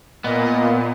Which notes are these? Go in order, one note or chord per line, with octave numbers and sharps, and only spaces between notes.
A#2 B3 D#5